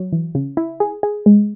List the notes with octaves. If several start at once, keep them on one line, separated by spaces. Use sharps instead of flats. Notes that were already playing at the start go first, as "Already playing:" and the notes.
Already playing: F#3
E3
C#3
E4
G#4
G#4
G#3